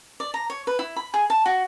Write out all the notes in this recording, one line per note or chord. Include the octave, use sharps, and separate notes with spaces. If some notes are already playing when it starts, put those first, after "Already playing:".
D5
A#5
C#5
B4
E4
B5
G#4
A5
F#4